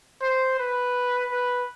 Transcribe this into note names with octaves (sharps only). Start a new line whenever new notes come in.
C5
B4
B4